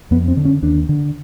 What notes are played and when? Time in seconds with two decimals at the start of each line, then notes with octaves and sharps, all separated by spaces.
0.11 F2 B3
0.28 C4
0.37 D3
0.45 C#4
0.62 D#2 D4
0.89 D3